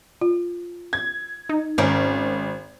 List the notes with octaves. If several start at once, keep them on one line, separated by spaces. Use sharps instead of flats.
F4
G#6
D#4
G#1 C#4 A#4